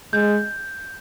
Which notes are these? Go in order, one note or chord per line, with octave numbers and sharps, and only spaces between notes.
G#3 G6